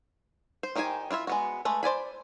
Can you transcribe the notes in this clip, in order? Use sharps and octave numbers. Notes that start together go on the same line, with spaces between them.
C5
D#3 D#4 G4 C5 G#5
D4 E4 F4 E5
G#3 B3 F#4
G#3 A3 B4
C5 D5 G#5 B5